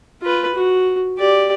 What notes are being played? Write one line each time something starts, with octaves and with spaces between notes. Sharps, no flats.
F4 B4
F#4
G4 D5